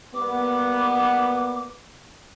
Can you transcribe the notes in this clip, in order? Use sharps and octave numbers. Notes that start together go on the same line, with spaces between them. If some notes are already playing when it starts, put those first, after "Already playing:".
G3 A#3 B3 D6